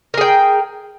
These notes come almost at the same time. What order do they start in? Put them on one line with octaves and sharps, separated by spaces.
A#4 G#4 G5